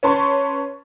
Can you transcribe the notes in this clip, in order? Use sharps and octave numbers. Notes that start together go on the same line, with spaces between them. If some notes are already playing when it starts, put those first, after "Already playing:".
C#4 B4 A5 C6 C#6